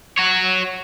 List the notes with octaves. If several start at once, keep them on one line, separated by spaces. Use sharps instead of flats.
F#4 C#5